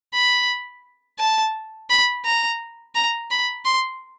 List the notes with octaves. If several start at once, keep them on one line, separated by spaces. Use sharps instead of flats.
B5
A5
B5
A#5
A#5
B5
C6